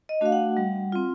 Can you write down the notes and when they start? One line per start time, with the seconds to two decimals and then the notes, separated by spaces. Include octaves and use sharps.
0.09 D#5
0.21 A3 D4 F#4 F5
0.32 F#5
0.57 G3
0.92 C4 F4